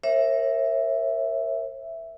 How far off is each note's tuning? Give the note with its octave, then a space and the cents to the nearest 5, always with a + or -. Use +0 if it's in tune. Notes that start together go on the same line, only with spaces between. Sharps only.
A#4 +0 C#5 -40 E5 +0